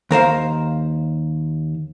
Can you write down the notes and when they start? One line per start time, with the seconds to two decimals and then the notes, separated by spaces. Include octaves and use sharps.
0.11 D#2 A#4 C5 F5